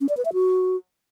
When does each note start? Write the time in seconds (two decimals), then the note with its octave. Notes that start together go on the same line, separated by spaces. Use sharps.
0.01 C#4
0.09 D5
0.17 B4
0.25 E5
0.33 F#4